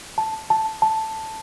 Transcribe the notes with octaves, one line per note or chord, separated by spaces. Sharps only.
A5
A5
A5